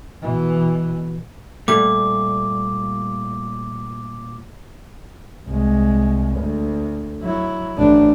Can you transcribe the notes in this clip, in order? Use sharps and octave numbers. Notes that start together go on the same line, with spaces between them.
B2 E3
A#2 G3 A3 D6
C2 G#3
D2
F#3 E4
A1 D4